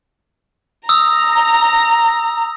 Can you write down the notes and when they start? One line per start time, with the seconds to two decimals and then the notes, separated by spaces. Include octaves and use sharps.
0.89 A#5 D#6 E6